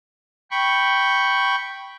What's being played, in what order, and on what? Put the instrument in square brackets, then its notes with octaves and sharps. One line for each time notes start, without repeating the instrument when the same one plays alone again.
[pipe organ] G5 B5 C#6